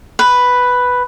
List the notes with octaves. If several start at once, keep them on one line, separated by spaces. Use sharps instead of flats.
B4